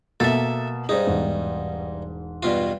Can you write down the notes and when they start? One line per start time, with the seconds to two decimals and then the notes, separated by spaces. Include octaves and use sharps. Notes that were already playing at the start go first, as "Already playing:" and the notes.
0.20 B2 A#3 A4 E5 A6
0.89 G2 D#4 G#4 C5
1.07 E1 G#2
2.43 G2 B2 F4